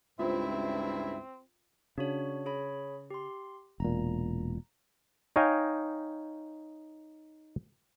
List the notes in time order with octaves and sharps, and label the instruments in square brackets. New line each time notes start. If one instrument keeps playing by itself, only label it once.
[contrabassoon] C#2 [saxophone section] G2 E4 E5 [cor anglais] C4 [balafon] F4 C5
[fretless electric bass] C#3 [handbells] D4 F#4 C#5
[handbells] G#4 C#5 B5
G4 C6
[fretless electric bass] E1 A#2 [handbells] A#5
[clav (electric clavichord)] D#4 C#5 D#5 F5 G5 G#5